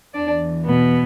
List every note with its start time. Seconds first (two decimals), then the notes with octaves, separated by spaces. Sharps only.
0.14 E2 E3 D4 D5
0.65 B2 B3